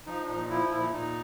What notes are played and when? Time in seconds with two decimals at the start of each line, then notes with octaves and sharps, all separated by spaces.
0.06 F3 D#4
0.24 D4
0.29 A#2 D#4
0.50 F3 E4
0.71 A#2 E4
0.92 A#2 D#4